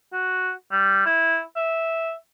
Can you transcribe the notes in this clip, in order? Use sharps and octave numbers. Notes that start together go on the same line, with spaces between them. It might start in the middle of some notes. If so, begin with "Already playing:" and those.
F#4
G3
E4
E5